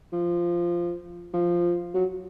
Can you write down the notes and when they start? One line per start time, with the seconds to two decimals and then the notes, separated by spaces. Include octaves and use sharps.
0.12 F3
1.33 F3
1.94 F#3